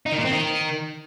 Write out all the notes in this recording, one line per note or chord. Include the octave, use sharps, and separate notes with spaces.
D#4
D#3
A#2
C4
D#3